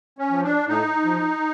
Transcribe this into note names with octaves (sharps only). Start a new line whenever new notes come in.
C#4
F3
D4
A2 D#4
F3